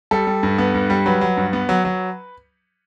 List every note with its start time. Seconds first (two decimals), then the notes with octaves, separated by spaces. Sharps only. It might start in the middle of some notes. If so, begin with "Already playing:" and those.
0.11 G3 A4
0.27 G3
0.43 G2
0.58 B3
0.74 G2
0.90 G3
1.06 F#3 B4
1.21 F#3
1.37 G2
1.53 B3
1.69 F#3
1.85 F#3